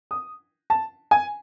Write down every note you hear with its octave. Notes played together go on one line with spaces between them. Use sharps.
D#6
A5
G#5